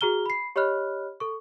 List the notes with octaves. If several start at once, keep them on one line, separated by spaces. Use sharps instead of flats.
F#4 G#4 A#5 F6 G7
B5 C7
G4 C#5 D#5 B5 F6 F#6
A4 C#6